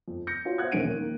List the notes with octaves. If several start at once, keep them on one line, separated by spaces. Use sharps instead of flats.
F2
G6 A#6 C#7
F4 F#4 C#5
C5 E5 F#5 F#6 G#6
E1 A#1 D#2 C#4 D7 D#7
D#3 A#3